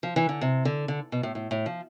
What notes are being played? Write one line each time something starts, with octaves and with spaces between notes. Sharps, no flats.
F3
E3
D3
C3
D3
D3
B2
A2
A2
A2
F3